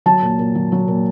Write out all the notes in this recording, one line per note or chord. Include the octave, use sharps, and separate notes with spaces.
F#3 A5
A#2
A#2
F#3
F#3
A#2